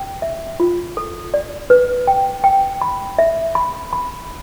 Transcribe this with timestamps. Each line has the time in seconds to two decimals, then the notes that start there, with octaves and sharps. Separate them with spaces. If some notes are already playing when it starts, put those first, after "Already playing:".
Already playing: G5
0.22 E5
0.60 F4
0.97 A4
1.34 D5
1.70 B4
2.07 G5
2.44 G5
2.82 B5
3.19 E5
3.55 B5
3.93 B5